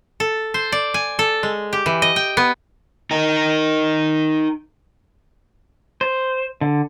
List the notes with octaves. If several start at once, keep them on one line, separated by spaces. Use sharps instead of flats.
A4
C5
D5
G#5
A4
G#3
G4
E3
D#5
G5
B3
D#4 A#4
C5
D3